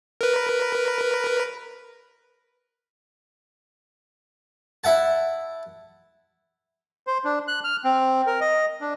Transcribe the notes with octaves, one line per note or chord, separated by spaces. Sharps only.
A#4 B4
E4 E5 F#5 A5
C5
D4
F#6
F6
C4
A#4
D#5
D4